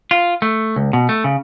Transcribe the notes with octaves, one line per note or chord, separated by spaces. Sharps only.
F4
A3
C#2
B2
A3
C#3